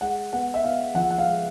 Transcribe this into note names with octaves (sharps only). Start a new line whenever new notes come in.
G#3 F#5
B3 F#5
E5
B3 F5
F3 F#5
F#5
F5
G#3